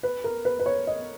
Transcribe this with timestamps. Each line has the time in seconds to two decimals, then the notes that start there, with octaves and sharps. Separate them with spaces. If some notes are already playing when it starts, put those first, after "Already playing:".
0.03 B4
0.24 A#4
0.45 B4
0.60 B4
0.66 C#5
0.87 D#5